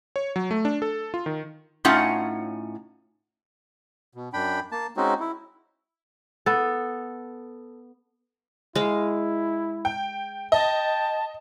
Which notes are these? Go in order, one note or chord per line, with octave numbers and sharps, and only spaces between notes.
C#5
F#3
A3
D4
A4
F4
D#3
A2 C#4 D#4 F4 F#5
B2
F#2 D4 G5 B5
A#3 A5
G#3 C4 C#4 D#4 F#4
E4
B3 A4
G#3 E4 F5
G5
D#5 G5 A5